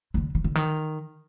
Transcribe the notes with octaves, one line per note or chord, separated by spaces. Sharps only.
C3
D3
D#3
D3
D#3